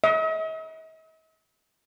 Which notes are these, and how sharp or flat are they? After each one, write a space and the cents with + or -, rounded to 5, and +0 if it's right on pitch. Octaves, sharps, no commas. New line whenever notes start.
D#5 +45